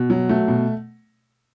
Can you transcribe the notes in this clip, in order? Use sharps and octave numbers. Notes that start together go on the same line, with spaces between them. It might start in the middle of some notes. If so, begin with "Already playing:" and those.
Already playing: B2
F#3
A3
B2